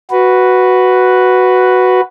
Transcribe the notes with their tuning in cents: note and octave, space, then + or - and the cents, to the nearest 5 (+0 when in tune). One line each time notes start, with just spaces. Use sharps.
F#4 +0 B4 +0